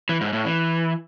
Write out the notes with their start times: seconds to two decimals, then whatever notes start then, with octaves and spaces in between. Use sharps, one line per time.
0.09 E3
0.21 G#2
0.33 A2
0.44 E3